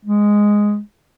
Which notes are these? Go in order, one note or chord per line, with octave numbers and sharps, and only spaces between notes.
G#3